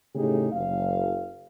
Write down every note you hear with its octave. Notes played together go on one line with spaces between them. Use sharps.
A2 C#3 A3 D#4 G4 G#4
F#1 F5